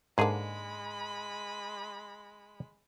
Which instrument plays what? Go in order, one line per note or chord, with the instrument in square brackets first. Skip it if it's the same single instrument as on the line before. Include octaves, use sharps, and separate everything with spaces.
[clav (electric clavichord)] G#2 G#4 [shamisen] D3 A#3 D4 [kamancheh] G#3 B5